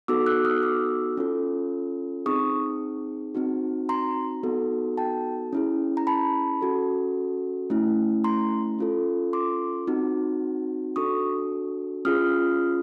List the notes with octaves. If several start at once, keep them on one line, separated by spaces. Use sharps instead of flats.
B3 D#4 F#4 A4 D6 E6
E6 F#6
D#6 F6
D6 E6
C#4 F4 A4
C4 D#4 G#4 C#6 D#6
C4 D#4 F#4
A#5 C6
B3 D#4 F#4 A4
G5 A5
C#4 E4 G#4
A#5
A5 B5
C#4 F#4 A4
A3 C#4 E4
A#5 C6
C#4 F4 A4
C6 D6
C4 D#4 F#4
D4 F#4 A4 C#6 D#6
C#4 F4 G#4 D#6 F6